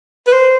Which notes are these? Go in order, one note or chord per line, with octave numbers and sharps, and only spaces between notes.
B4
C5